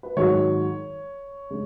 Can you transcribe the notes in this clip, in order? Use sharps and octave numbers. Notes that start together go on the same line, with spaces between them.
B4
G#2 D#3 F#3 C#5
C#3 G#3